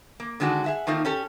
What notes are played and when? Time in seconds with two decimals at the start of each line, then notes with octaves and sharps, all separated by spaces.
0.20 A#3
0.40 D3 D#3 G#3 D4 F#4
0.64 G#4 E5 F#5
0.87 D#3 A3 A#3 C4 D#4 F4
1.05 C#4 G4 A4